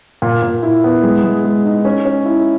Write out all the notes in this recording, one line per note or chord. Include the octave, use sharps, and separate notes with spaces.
A#2
A#2
E4
B3
G#3
G#3
G#3
D#4
C#4
C#4
E4